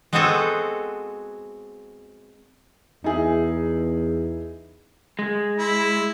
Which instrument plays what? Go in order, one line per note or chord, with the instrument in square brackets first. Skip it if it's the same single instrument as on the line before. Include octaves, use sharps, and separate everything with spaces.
[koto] G#3 B3 C4 F#4 G#4 A4
[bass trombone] E2 [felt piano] D#4 E4 G#4
[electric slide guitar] G#3
[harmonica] E4